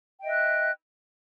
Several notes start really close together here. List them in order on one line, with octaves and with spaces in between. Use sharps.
G5 D#5 E5 F#6